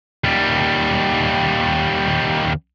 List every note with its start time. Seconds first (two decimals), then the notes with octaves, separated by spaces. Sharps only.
0.24 D#2 G3